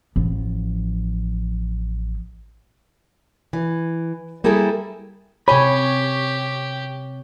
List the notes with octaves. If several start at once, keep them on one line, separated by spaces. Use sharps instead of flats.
A1 F3
E3
G3 A#3 E4 G#4 A4
C3 G4 C#5 G#5 B5